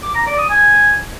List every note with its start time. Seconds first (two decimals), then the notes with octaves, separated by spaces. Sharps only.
0.03 D6
0.15 A#5
0.26 D5
0.38 D#6
0.50 G#5